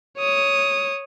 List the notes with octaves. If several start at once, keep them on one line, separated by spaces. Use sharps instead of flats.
C#5 D#6